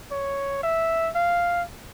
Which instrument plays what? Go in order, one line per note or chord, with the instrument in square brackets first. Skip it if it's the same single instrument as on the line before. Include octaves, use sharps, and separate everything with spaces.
[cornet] C#5
E5
F5